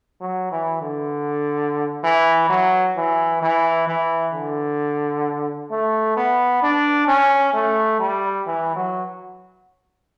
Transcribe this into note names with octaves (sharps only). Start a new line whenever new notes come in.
F#3
E3
D3
E3
F#3
E3
E3
E3
D3
A3
B3
D4
C#4
A3
G3
E3
F#3